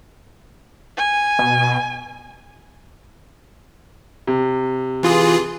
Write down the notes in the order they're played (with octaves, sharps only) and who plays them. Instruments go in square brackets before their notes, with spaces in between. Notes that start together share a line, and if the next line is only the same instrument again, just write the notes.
[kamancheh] G#5
[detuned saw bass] B2
[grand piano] C3
[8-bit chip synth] E3 F4 G#4